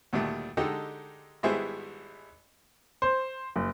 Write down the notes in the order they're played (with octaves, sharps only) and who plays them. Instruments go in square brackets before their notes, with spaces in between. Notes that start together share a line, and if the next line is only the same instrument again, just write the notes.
[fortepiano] D2 A#2 D#3 G3 A3
D3 G#3 D#4 G4 A4
G#1 G3 B3 E4 G#4 C5
[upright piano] C5
F#1